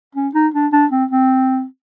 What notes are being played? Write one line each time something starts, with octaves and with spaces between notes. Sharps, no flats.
C#4
D#4
D4
D4
C4
C4